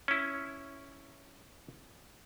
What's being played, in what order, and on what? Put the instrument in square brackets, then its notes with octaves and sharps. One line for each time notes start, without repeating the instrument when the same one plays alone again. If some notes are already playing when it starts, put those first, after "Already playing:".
[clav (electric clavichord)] C#4 E4